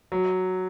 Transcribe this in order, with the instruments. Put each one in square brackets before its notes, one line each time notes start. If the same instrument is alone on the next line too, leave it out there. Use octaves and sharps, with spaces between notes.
[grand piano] F#3